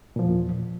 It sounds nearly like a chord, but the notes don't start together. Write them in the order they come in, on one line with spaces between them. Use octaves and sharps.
A#2 F3 E2